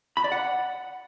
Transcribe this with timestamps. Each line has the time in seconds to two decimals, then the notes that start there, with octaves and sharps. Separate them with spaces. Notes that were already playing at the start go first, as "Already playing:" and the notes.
0.17 B5
0.24 D5
0.32 F#5